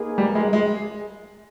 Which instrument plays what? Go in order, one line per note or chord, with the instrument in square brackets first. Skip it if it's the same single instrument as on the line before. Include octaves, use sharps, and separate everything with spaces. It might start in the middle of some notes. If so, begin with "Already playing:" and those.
Already playing: [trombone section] A#3 D#4 G#4 B4
[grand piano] G3
G#3
G#3